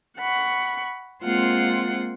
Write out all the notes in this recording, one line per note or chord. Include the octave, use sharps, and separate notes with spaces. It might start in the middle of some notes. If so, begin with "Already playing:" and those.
F#5 B5 C#6
G#3 A#3 C4 F4 F#5 C6